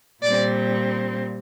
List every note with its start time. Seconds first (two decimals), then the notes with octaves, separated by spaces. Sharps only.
0.23 A#2 G3 C4 D5